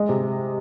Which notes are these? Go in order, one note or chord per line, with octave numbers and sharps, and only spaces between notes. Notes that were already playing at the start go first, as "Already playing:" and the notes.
Already playing: G#3 D#5
C3